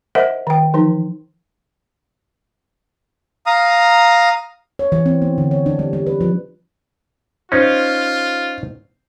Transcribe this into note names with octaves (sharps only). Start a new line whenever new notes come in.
A#4 C5 D#5 E5 F#5
D#3 G5
E3 F3 D#4
F5 A#5 D#6
C#5
E3
C4
B3
D3
C#5
D4
G3
G3
B4
F3
C#4 D#4 F4 C5